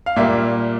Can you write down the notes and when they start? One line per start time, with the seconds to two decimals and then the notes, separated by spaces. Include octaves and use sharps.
0.06 F5
0.16 A#2 G3 A#3 E5